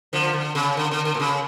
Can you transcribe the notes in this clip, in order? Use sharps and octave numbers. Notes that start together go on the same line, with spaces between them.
D3 F3
D3
C#3
D3
D3
D3
A#2
C#3